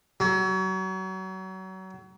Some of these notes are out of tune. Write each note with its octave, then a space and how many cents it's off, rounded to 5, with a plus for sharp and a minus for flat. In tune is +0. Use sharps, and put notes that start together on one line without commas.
F#3 +30